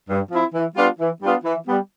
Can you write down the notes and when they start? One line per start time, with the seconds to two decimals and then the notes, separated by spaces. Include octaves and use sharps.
0.09 G2
0.31 F3 C4 E4
0.54 E3
0.77 G3 B3 D4 F4
0.99 E3
1.23 G3 B3 D4 F4
1.44 E3
1.67 G3 B3